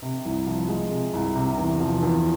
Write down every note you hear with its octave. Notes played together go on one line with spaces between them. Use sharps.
C3
C2
F3
G#3
C3
C2
C3
E2
F3
E2